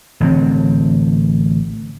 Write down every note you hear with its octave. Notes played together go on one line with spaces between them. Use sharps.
A1 D3 C4